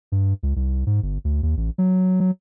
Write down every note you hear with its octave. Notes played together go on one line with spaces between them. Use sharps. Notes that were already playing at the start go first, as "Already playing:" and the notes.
G2
C#2
C2
G#2
G1
D2
D#2
A1
F#3
F#3